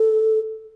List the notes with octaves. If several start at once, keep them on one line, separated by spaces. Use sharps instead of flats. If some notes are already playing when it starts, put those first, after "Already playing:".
Already playing: A4